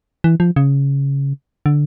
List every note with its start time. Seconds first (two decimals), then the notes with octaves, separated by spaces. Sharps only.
0.24 E3
0.40 F3
0.56 C#3
1.66 D3